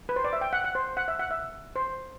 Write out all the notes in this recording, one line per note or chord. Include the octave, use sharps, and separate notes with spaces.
B4
C5
D5
E5
G5
F#5
F#5
C5
F#5
E5
F#5
E5
C5